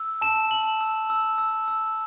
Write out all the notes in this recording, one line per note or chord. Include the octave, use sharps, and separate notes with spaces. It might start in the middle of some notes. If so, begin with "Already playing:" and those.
Already playing: E6
A5 E7
A5 F#7
E6
E6
E6
E6